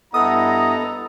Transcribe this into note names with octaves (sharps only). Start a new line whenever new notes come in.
G2 B3 E4 A4 D#5 F#5 A#5 D#6